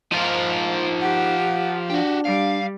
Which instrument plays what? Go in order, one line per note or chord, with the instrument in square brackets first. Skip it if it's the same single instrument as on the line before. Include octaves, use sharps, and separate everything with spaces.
[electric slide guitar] F3 F4 A#4 [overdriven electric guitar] D#4 C5
[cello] G4 [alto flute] F#5
[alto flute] D4 [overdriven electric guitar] F#4 G4
[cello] G3 [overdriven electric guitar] F5